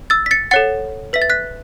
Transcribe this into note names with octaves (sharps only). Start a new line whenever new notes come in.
E6 A6
B6
A6 C#7
A4 C#5 F#5 A6 C#7
B4 E5 B6
A6
F#6 B6